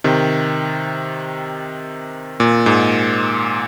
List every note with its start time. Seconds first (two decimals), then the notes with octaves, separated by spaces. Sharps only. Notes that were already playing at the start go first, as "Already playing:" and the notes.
0.04 C3 D#3
2.40 A#2
2.66 G#2